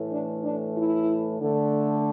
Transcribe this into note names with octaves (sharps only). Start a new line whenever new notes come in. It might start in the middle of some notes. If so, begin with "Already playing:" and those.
Already playing: A2 E3 A3
D4
D4
E4
D3 A3